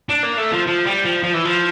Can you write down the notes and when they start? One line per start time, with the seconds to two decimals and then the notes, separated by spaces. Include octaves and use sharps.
0.09 D4
0.23 A#3
0.38 A3
0.52 F3
0.67 F3
0.85 G3
1.05 F3
1.23 F3
1.34 E3
1.45 F3